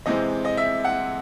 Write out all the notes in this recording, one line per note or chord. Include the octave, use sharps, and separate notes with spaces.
C3 E3 G#3 C4 D#5
D#5
E5
F#5